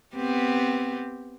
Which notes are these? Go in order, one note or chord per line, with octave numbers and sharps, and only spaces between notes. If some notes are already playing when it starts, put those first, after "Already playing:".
B3 C4 G4